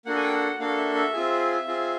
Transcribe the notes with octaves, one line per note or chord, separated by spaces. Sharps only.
A#3 D4 F#4 A4 F#5
G#5
G5
F#5
A#3 D4 F#4 A4 F5
E5
E5
C4 F4 G#4
C4 F4 G#4